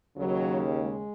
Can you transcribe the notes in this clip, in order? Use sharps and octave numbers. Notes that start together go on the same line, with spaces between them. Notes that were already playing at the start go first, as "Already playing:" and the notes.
D#2 C#3 F#3
G#3